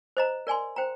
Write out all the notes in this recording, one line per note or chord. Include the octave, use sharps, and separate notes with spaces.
C5 D#5 A#5
A#4 D5 G#5 C6
C5 G5 A#5